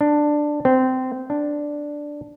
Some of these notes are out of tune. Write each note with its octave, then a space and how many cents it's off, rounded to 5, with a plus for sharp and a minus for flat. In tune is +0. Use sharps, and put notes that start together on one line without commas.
D4 +10
C4 -20
D4 +0